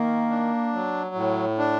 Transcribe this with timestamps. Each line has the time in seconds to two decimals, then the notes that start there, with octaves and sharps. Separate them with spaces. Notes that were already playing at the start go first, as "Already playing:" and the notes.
Already playing: D#3 A#3
0.30 D4
0.73 F#3
1.15 A2
1.58 D4